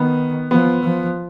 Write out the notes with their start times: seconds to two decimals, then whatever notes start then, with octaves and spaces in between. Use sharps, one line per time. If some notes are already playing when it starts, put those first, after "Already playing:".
Already playing: D#3 B3
0.51 F3 B3
0.83 F3